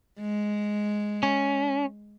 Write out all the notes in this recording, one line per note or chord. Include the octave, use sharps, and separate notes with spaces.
G#3
C#4